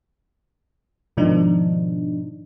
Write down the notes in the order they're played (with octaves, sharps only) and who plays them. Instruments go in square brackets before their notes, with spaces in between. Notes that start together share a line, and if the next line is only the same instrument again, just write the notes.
[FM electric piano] G#2 B2 D#3 F3 D4 D#4